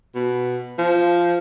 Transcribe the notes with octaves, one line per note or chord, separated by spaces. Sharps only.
B2
F3